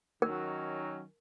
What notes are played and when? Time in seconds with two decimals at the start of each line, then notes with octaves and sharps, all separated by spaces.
0.22 D#3 F#3 C#4 A#4